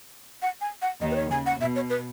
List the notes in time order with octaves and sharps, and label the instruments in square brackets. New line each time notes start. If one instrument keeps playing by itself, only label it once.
[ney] F#5
G#5
F#5
[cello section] D#2 D#3 [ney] D#5
[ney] B4
C#5
[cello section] C#3 [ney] G#5
[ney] F#5
[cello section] B2 [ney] E5
[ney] C#5
B4